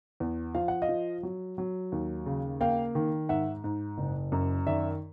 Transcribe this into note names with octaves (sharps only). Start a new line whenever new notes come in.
E2
F3 F5
F#5
D#5 F5
F3
F#3
F#3
D#2
C#3
A#3 F5 G5
D#3
G#2 E5 F#5
G#2
F#1
F#2
D#3 D5 E5